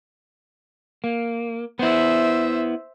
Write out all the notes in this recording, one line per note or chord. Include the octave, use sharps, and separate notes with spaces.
A#3
B3 E4 C5 E5